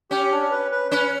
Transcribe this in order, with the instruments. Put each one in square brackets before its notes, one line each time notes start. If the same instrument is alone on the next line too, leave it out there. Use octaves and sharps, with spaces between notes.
[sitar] C#4 [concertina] G4
[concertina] D4
B4
B4
[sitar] C#4 [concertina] B4